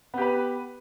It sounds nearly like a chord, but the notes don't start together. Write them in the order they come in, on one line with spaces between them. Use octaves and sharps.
B3 G4 B4